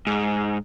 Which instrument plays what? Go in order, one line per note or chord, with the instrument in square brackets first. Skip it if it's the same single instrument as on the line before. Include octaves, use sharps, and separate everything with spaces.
[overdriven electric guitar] G#2